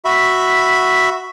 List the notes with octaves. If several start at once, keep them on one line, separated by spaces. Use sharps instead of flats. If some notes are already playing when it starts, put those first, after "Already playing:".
F#4 E5 B5